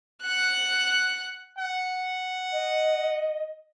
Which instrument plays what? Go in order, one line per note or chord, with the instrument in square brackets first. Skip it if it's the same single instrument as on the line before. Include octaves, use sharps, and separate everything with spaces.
[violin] F#5 F#6
[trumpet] F#5
[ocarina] D#5